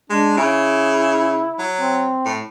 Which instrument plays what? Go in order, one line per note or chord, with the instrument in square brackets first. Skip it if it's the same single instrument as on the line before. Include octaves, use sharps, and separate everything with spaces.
[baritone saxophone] G#3 [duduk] D4
[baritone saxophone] C#3 [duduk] E4
[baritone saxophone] F#3
[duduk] C4
[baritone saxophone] A2